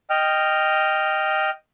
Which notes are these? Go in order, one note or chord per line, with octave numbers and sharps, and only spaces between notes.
D#5 G5 F6